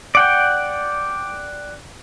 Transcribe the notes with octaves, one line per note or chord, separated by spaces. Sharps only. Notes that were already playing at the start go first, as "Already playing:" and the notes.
D5 F#5 G5